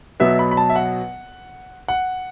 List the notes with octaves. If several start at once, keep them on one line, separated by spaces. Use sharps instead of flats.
B2 F#3 B3 E5
B5
B5
A5
E5
F#5
F#5